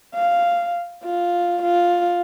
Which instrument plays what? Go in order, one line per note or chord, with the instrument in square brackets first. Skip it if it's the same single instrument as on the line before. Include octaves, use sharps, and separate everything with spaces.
[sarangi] F5
F4
F4